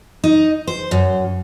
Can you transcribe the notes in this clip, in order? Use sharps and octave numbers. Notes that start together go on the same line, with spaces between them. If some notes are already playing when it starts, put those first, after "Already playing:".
D#4
C5
F#2